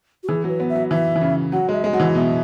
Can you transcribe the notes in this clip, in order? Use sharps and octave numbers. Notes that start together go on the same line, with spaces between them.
F#4
E3 G#4
F#3 B4
B3
E5
F#3
E3 E5
E3
C#3
F#3 F#5
G#3 E5
G#3
F#3 F#5
E3
B2 E5